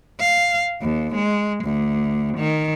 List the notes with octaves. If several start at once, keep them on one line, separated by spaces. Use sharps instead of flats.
F5
D#2
G#3
D2
D#3